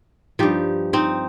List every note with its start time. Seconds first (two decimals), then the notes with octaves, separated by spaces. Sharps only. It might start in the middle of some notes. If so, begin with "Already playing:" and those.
0.39 G2 F3 D#4 G4
0.93 C4 D#4